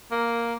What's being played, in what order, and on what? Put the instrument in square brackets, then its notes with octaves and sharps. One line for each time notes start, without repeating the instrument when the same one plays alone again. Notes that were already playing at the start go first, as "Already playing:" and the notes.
[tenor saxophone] A#3